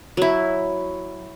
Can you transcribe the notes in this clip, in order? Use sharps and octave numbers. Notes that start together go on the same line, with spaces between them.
F#3 E4